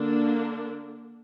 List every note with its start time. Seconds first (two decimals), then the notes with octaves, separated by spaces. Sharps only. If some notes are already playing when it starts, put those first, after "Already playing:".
Already playing: D3 A#3 D4